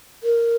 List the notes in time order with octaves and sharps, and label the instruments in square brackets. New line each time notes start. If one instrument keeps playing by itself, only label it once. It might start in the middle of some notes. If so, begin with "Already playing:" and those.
[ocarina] A#4